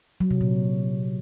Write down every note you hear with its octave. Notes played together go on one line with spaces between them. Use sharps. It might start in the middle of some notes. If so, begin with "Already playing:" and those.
F#3
C3
A#2